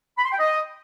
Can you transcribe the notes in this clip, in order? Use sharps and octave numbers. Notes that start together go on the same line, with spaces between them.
B5
C6
G5
D#5